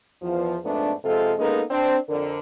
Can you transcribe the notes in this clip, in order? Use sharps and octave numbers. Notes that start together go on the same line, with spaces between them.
E2 F3
F2 G#2 A3 B3 D4
F2 C3 G#3 F4 A4
G#3 A#3 B3 C#4 D#4 A4
C4 D4
F2 D3 A#4